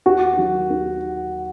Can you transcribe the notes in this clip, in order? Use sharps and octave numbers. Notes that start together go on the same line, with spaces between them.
D#2 F#4
D#3 F#3
D#2